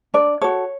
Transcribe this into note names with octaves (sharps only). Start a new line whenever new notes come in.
D4 D5
F#4 A4 C#5